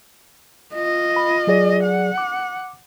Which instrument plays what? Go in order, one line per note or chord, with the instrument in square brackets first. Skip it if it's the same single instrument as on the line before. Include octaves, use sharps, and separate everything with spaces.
[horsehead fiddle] F4 D#5
[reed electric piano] B5
F#3 G#4 D5
[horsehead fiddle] F#5
[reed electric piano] D6